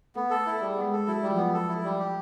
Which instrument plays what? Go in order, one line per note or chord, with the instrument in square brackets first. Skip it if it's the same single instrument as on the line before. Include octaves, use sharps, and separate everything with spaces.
[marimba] A3 A4 [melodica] B3
[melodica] A4
E4
[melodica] G3 [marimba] G#4
[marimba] A4
[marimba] G#3 G#4 [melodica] B3
[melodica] A4
[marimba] F#3 F#4 [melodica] E4
[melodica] G3
[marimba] F3 F4
[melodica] B3
A4
E4
G3
G4